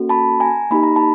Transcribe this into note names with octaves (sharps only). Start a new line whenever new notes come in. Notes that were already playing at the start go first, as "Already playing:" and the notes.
Already playing: A#3 C#4 F#4 A4
A5 B5
G#5 A#5
A#3 D#4 G4 B5
A#5
A5 B5